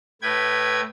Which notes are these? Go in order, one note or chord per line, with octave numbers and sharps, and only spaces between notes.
A2 B4 G5 G#6